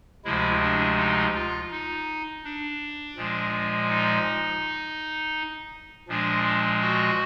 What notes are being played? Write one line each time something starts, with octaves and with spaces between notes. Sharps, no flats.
D2 C3 F3 G#3 E4
D4
D#4
F4
D#4
D4
A#2 F3 G#3
D#4
A#2 F3 G#3 D4
F#4